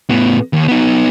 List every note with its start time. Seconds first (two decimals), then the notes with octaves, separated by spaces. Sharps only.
0.10 A2 B3
0.53 D#2
0.68 B3 D#4